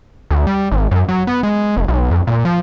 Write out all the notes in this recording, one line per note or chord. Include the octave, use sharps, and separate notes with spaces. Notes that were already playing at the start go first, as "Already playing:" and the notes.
D2
G3
G#1
F#2
F#3
B3
G#3
F1
B1
F2
A#2
F3